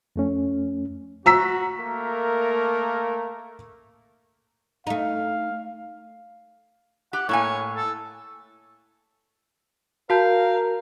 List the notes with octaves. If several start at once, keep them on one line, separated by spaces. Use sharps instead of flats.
F2 A3 C#4
F#4 A#5 E6 B6
A3 A#3 A#4
A3 D#4 F5
G4 F#5
A2 A#3 C#5 G#5
A4
F#4 A#4 F5 A5 G6